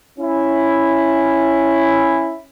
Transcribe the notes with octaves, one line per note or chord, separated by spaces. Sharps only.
C#4 E4